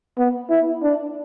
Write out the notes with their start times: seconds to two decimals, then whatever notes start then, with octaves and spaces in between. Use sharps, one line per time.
0.18 B3
0.49 E4
0.83 D4